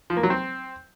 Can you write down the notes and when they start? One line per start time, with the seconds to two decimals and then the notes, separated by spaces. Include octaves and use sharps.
0.10 F3
0.17 A#3
0.23 F#3
0.30 C4